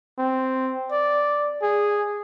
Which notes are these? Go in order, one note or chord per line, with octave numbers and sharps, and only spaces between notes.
C4
D5
G#4